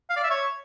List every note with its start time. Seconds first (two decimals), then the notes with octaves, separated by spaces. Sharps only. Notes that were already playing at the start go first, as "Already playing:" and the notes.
0.09 F5
0.16 D5
0.23 E5
0.30 C#5